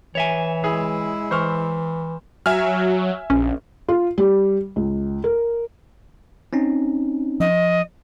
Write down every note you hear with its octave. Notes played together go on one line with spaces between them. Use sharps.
E3 C#5 E5 G#5
G#3 E4 G#4
E3 C5 C#6 F6
F#3 E5 G#5 F6
A#1 C#4
F4
G3
C#2
A#4
C4 C#4 D#4
F3 D#5